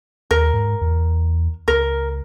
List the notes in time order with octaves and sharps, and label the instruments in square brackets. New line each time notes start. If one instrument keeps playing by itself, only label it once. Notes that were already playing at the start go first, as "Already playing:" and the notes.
[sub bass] D#2 [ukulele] A#4
[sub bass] G#2
E2
[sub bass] C#2 [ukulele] A#4